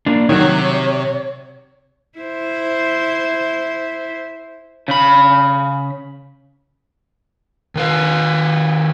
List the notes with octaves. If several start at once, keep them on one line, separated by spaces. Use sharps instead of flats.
A#3 D4
C3 D#3 F#3 C#5
E4 C5
C#3 B5
D#3 B4 F5